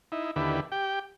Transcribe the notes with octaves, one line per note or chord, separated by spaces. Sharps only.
D#4 E4
D#2 D3 E4 G4 B4
G4 G5